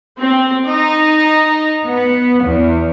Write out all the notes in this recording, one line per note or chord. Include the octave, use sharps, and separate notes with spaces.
C4
D#4
B3
E2